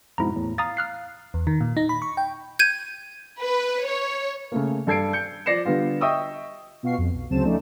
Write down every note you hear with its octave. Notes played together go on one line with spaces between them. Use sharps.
F2 G#2 B2 E4 A#5
E2 A2
F5 A#5 D#6 A6
F6 F#6 C7
E2
D#3
A#2
D#4
B5
C#6
G5
G6 G#6 D#7
B4
C#5
C#3 A3 A#3
G2 A4 G#6 C7 D7
G6 C#7
F3 D5 A#6 C7 C#7 E7
D3 G3 B3 F4
D#5 E5 G5 C#6 D#6 E6
B2 F4 F#4 F5 C#6 C7
F2
B1
D2 C#3 F#3 C4 A5 E7
F3 A3 C#4 D#4 D5